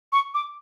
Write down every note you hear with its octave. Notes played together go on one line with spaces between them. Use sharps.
C#6
D6